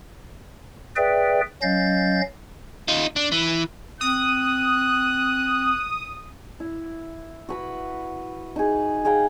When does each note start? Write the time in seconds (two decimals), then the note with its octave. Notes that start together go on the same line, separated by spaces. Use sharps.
0.96 G#4 B4 D5 E5 G5
1.62 F#3 C#4 D#5 F5 G6 A6
2.88 D#4 F4
3.16 D4
3.32 E3
4.01 C4 D#6 F#6
6.60 E4
7.49 F#4 B4 B5
8.56 D#4 G#4
9.05 G#4 F5 G5 A#5